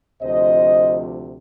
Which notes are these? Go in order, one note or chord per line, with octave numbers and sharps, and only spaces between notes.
D2 C3 F3 C5 D#5